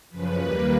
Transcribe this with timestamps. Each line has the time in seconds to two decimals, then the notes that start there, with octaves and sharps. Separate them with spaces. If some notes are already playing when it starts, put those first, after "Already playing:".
0.10 F#2 C#3 F3 B4
0.39 D#2 D#3 G3 A#3